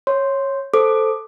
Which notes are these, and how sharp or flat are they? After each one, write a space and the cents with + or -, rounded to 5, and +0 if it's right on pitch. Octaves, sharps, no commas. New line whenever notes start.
C#5 -15 C6 +0
A4 +0 C5 +0 D6 +15